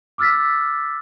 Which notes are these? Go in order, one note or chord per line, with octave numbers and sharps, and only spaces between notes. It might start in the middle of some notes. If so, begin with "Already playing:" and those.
D6 E6 F6 A6 B6